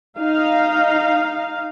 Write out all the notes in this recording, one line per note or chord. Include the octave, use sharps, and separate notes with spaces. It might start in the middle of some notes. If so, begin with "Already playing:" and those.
D#4 F5